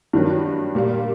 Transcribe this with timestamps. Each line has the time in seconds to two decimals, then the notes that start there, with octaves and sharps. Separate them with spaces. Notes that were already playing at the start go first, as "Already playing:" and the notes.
0.13 G2 D#3 F#3
0.75 A#2 G3 A#3